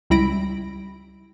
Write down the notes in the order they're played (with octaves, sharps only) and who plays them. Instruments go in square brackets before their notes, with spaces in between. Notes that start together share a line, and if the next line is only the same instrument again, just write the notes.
[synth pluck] C#2 G3 E4 B5 A#6 D7